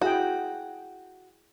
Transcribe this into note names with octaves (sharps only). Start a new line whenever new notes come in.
E4 F#4 G#4 G5